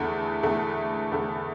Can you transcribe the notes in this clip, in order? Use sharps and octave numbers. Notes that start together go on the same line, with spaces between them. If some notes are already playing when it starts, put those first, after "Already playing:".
Already playing: E2 D3 A3
E2 D3 A3
E2 D3 A3